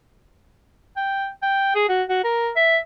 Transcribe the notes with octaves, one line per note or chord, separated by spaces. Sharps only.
G5
G5
G#4
F#4
F#4
A#4
E5